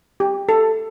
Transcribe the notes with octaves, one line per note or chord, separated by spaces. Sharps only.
G4
A4